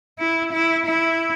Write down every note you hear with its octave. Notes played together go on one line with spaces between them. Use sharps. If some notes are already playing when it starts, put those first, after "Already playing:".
E4
E4
E4